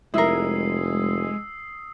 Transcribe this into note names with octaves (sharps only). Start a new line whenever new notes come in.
F1 G#3 E4 A#4 D#6 E6 C7